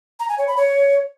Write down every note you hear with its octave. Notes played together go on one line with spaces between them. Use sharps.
A#5
G#5
C#5
B5
C#5